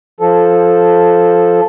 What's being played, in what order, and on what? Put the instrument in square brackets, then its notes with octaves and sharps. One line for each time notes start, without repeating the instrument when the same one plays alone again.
[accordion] F3 A4